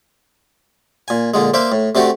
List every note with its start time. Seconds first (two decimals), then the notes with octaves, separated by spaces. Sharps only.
1.08 A#2 G#5
1.34 A#2 D3 G#3
1.54 A#3 C5 D5 E5
1.72 A2
1.95 C3 A3 D4 F#4 G4